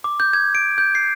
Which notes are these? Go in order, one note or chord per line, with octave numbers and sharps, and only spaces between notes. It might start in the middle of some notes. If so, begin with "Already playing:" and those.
D6
G6
G#6
D7
G6
C7